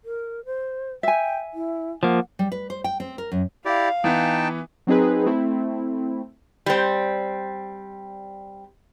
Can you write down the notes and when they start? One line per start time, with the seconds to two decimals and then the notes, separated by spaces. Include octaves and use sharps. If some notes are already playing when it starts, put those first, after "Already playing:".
0.05 A#4
0.46 C5
1.03 E5 G5 G#5
1.54 E4
2.03 F3 A#3 F#5
2.39 G3
2.52 B4
2.70 C5
2.84 G5
3.00 C4
3.18 A#4
3.32 F#2
3.65 E4 G4 D5 F5
4.04 E3 B3 D#4 G5 A5
4.87 F#3 C4 D#4 G#4 B4
5.26 A3 C4 E4
6.66 G3 C4